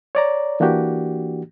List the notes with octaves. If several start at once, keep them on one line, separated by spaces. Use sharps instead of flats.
C#5 D5 A#5
E3 A#3 D4 F#4 G4